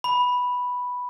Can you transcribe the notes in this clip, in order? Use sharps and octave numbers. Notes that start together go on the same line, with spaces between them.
B5